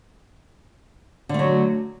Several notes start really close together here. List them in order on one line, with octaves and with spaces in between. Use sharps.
D3 A3 F#3